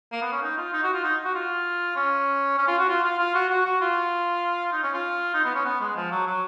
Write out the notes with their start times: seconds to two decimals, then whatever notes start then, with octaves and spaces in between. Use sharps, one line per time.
0.12 A#3
0.22 B3
0.32 C#4
0.42 D#4
0.58 F4
0.73 D#4
0.84 F#4
0.94 F4
1.04 D#4
1.25 F#4
1.35 F4
1.96 C#4
2.58 C#4
2.68 F4
2.78 F#4
2.88 F4
3.04 F4
3.19 F4
3.35 F#4
3.50 F#4
3.65 F#4
3.81 F4
4.73 D#4
4.83 C#4
4.93 F4
5.34 D#4
5.45 B3
5.55 C#4
5.65 B3
5.81 G#3
5.96 F3
6.11 F#3
6.26 F#3